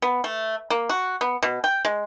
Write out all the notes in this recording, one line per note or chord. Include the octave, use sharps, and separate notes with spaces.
B3
A3
A#3
F#4
B3
B2
G5
G#3